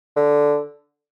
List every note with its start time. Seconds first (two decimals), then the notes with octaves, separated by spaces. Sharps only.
0.16 D3